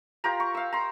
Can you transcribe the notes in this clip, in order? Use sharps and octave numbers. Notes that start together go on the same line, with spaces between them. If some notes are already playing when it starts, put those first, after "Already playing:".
F4 G4 A#4 A#5
C#6
F5 E6
A#5 C6